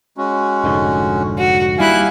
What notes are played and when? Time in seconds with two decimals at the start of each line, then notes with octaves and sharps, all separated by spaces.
0.17 G#3 C#4 F#4
0.64 F1 G#2 D3
1.38 F#4
1.78 D#2 G3 E4 F5 G#5 F#6